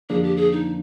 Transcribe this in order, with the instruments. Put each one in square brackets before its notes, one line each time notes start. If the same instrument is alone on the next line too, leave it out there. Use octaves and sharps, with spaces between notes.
[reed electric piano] F2 D3 F3 A#3 D4 [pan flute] G#4
[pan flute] G4
G#4
D#4